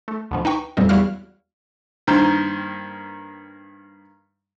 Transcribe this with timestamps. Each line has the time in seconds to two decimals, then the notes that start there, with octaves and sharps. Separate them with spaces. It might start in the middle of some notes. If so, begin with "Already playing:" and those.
0.08 A3
0.31 D2 B2 F3
0.45 D#4 B4 G5 C#6
0.77 F2 A#2 G3 C4 D#4
0.89 E2 G3 E4 F#4 F5 F6
2.07 G2 D#3 A#3 C5